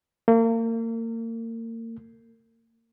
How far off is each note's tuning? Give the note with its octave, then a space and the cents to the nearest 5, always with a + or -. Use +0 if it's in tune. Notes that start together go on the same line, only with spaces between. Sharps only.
A#3 -35